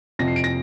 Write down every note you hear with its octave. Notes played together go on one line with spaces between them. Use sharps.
F2 C3 F3 A#6
C7
D7
A#6